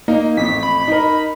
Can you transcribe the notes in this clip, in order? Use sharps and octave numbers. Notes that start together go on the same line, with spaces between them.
A#3 D#4
A1 F2 B6
B5
D#4 A#4